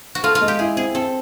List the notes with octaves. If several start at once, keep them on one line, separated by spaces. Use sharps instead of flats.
F#4
F4 A4
F4
G#3
G4
E4 G#4
C4 G#4
C4 A4